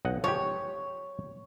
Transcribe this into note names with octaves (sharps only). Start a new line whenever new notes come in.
B1 D#5 F#5
F3 G#3 G4 C#5